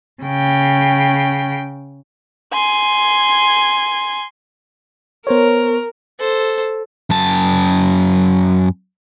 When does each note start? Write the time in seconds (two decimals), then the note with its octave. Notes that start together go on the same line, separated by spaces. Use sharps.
0.23 C#3 G5
2.53 G#5 C6
5.27 B3 A#4 C5 C#5
6.19 A4 C5
7.10 F#2 A5